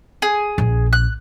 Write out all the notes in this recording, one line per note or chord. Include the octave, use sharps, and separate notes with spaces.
G#4
A#1
F#6